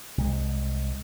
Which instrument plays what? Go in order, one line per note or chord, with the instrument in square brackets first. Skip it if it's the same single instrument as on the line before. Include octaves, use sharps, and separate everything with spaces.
[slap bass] C2 G#3